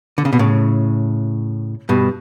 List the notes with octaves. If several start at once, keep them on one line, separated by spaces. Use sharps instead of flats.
D3
C#3
B2
A2 C#3
G2 B2